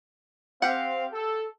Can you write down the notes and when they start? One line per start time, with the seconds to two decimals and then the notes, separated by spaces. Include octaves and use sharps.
0.62 C4 G4 F5 F#5
1.13 A4